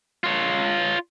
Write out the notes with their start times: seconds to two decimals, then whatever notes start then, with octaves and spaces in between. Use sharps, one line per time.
0.24 F4 C#5